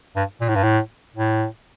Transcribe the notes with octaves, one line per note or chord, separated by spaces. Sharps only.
G2
A#2
A2
G2
A2
A2